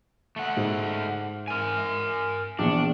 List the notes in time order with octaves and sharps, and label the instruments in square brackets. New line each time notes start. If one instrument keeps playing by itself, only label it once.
[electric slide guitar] A3 F#5
[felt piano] G#2
[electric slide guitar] A#4 G#5
[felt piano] A#1 E2 C#7 [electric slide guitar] D4